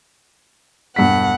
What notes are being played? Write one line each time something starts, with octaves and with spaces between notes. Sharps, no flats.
E1 G2 F#5 B6